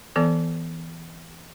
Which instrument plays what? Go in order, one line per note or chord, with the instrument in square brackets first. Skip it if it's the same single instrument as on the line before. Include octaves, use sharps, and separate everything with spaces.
[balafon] E3 B3 A4 D5 A5